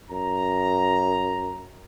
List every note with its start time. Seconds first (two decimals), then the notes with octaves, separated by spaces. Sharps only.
0.11 F#2 A#5